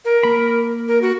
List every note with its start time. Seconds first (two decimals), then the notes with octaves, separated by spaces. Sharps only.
0.05 A#4
0.23 A#3 B5
0.88 A#4
1.02 F#4